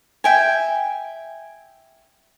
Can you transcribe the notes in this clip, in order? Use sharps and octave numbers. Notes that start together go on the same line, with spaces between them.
E5 G5 G#5